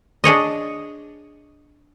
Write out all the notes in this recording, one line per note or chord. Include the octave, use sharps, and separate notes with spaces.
D4 G#4 C#5 D#5